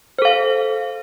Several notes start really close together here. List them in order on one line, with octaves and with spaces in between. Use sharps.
C5 A4 F5